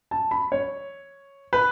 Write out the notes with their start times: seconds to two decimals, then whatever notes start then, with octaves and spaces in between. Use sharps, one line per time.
0.11 A5
0.31 B5
0.52 C#5
1.53 B4